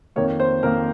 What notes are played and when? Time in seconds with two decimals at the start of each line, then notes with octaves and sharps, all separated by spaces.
0.16 F2 D#3 A#3 C#5
0.40 C5
0.63 F2 D#3 A#3 A#4